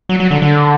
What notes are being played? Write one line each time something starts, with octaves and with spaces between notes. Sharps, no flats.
F#3
F#3
D3
D3